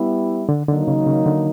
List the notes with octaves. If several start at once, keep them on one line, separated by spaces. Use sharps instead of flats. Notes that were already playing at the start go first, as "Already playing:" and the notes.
Already playing: G3 B3 E4 G4
D3
D3 D#3 F#3 A#3 D#4
C#3
C#3
D3